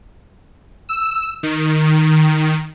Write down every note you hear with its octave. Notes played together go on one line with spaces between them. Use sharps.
E6
D#3